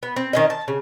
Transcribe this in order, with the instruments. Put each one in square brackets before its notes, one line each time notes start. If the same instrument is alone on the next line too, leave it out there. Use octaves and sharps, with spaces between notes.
[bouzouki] B3
C4
D#3 C#4 D#5
A5
C#3